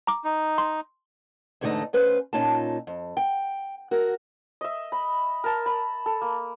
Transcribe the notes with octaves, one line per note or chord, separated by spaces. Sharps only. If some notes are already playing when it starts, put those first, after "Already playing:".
A#5 D6
D#4
C6
E2 G#2 D3 A3 D#4 D#5
D2 C#4 B4 C5
A#2 C#4 D#4 F4 A5
F2
G5
F#4 A#4
D#5 E5
B5
A#4 A5
B5
A4
A#3